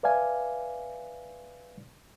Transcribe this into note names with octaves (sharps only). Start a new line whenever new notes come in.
B4 D5 E5 F5 G#5